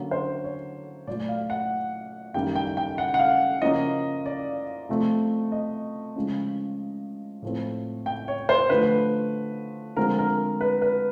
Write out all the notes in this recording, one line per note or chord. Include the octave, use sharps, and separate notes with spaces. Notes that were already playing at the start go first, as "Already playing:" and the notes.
Already playing: D3 F#3 A#3 C#4
C5
C#5
A#2 F#3 A3 D5
F5
F#5
F#2 D#3 G3 A#3 G5
G5
G5
F#5
F#5
F5
C#3 F3 A#3 C#4 D#5
D5
C3 F3 A3 C4
D#5
C#3 F3 G#3
A2 F3 A3 C4
G5
C#5
C5
D3 F3 A3 B4
D3 F3 G#3 C4 A#4
A#4
B4
B4